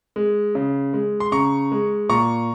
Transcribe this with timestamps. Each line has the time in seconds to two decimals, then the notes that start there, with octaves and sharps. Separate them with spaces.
0.16 G#3
0.55 C#3
0.93 G#3
1.20 C6
1.32 C#3 A#5 C#6
1.72 G#3
2.09 A#2 A#5 C#6